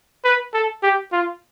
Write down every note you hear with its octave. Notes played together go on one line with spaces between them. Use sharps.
B4
A4
G4
F4